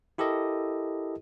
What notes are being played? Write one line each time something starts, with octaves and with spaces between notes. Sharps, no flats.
E4 G4 A4 A#4 D#5